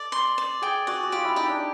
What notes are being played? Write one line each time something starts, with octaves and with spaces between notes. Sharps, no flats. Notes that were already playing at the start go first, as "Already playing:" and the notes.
Already playing: A4 D5 D#5
C6
D5
G#4 G5
F#4 D5
F#4
F4 G4
E4
D#4 G4
D4